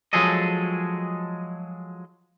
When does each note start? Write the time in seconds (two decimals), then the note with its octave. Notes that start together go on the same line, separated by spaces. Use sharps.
0.13 F3 F#3 G#3 G#4 A4 D#5